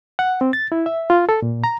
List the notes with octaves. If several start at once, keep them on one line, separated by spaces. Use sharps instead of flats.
F#5
C4
A6
E4
E5
F4
A4
A#2
A#5